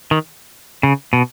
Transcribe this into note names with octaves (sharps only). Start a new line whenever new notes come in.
D#3
C#3
B2